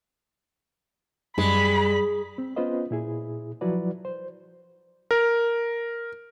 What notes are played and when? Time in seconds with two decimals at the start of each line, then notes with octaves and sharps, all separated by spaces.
1.38 F#2 G3 G#3 B5
2.38 C4
2.56 B3 C#4 F4 B4 C5 D#5
2.91 A#2 E4 G#4
3.61 F3 F#3 E4 F#4 B4 D5
4.05 C5
5.11 A#4